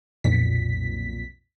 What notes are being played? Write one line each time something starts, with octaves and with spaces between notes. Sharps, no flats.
B1 F2 A#2 B6